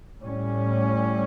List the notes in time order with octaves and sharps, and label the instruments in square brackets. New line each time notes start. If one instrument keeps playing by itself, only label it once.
[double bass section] A2 G3 C#4